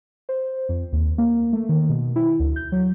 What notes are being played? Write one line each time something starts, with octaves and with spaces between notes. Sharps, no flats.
C5
F2
D#2
A#3
A3
D#3
B2
E4
D2
G6
F#3